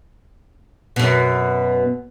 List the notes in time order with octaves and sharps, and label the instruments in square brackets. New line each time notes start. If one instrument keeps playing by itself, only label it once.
[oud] F#2 B2